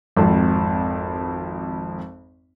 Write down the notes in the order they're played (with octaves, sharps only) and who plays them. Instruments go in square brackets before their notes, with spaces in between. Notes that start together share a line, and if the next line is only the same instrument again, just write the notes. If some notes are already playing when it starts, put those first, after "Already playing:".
[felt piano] G#1 F2